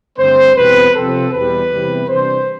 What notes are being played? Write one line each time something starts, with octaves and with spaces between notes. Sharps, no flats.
G2 D3 A3 C4 C5
E2 B2 G3 C4 B4
C3 F3 C4 A4
E2 B2 G3 B4
E2 C3 G3
C3 E3 G3 D4 C5